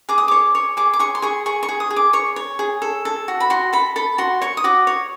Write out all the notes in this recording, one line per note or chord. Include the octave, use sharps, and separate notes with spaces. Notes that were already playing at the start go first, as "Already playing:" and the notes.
G#4 D6
D#6
C#5 D6
C#5
G#4 D6
D6
G#4 C#6
C6
G#4 C#6
G#4 C#6
C#6
G#4
D#6
G#4
D6
C#5 C#6
C#5
G#4
A4
A4
F#4
B5
F#4 C6
A4 B5
A4 B5
F#4 C6
C#5 C#6
D#6
F#4 D6
C#5